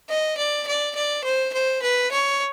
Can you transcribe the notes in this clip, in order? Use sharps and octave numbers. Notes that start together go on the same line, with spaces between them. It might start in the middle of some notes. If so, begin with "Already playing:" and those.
D#5
D5
D5
D5
C5
C5
B4
C#5